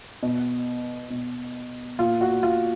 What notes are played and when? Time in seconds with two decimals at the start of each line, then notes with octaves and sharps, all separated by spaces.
0.23 B2
1.10 B2
1.99 A#2 F4
2.21 F#4
2.43 F4